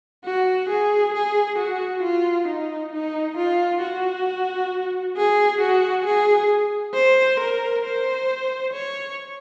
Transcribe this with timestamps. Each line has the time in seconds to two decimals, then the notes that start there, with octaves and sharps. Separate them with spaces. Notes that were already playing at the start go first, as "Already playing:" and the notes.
0.24 F#4
0.69 G#4
1.14 G#4
1.58 F#4
2.03 F4
2.48 D#4
2.92 D#4
3.37 F4
3.82 F#4
5.16 G#4
5.61 F#4
6.05 G#4
6.94 C5
7.40 A#4
7.85 C5
8.73 C#5